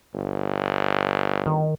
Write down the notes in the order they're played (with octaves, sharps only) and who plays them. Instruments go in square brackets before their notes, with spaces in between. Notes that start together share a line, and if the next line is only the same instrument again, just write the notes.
[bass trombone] G1
[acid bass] D#3